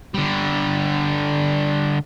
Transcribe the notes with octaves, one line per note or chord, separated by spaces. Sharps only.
D3 G3